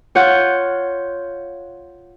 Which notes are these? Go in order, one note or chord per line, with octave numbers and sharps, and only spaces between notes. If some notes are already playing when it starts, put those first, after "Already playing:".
F4 C#5 F#5 G6